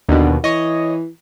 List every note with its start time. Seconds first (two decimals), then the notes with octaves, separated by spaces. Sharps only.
0.09 D#2 B2 D3
0.44 E3 C#5 D#5